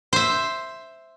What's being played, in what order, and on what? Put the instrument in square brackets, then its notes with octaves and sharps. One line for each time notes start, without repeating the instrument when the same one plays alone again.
[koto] C5 E5